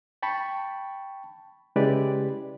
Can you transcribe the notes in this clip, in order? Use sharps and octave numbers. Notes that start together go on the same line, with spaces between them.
G5 A5 B5 C#6
C#3 G#3 E4 G4 B4 D5